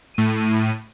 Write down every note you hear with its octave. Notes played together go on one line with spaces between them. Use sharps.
A2 D#7